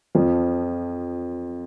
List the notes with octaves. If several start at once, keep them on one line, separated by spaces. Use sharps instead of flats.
F2 F3